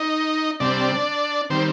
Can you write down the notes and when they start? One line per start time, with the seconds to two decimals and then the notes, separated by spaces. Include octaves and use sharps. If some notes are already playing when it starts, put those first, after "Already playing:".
Already playing: D#4 D#5
0.60 C3 G3 C4 D4 D5
1.50 D#3 G3 C4 C5